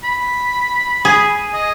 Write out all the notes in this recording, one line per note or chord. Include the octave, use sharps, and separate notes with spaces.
B5
G#4
D#5